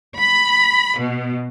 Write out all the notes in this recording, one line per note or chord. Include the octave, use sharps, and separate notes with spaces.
B5
B2